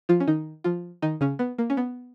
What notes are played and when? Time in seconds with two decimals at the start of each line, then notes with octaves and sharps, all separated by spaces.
0.09 F3 F4
0.20 C#4
0.28 D#3 D#4
0.64 F3 F4
1.02 D#3 D#4
1.21 C#3 C#4
1.39 B3
1.58 A#3
1.70 C#4
1.77 B3